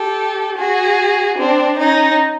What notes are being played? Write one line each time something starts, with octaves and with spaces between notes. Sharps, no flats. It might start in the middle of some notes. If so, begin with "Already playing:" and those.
Already playing: G4 A4
F#4 G#4
C4 D4
C#4 D#4